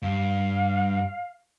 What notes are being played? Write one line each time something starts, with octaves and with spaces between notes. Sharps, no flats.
G2 F5